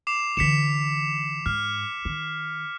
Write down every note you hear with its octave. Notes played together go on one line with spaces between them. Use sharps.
D6 C7 E7
D3 E3 B6 C#7 E7
G#2 F6
D#3